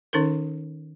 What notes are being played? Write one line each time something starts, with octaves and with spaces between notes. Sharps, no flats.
D#3 C#4 D#4 A4 A#4